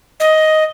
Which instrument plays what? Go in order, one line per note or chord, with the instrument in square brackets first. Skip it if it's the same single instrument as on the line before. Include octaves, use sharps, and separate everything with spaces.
[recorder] D#5